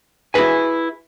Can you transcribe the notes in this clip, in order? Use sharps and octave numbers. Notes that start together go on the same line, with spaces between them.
E4 F#4 G#4 B4 G#5